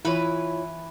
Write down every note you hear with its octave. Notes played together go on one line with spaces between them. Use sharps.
E3 E4 F4 B4 C#5 B5